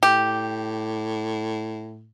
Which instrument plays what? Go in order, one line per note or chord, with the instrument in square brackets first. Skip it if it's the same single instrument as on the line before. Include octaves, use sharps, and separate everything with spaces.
[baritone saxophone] A2 [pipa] G4